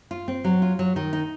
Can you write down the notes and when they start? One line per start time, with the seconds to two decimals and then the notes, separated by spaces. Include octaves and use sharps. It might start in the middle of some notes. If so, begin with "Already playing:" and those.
0.11 F4
0.28 C4
0.45 F#3
0.62 F4
0.79 F#3
0.96 D#3
1.13 D#4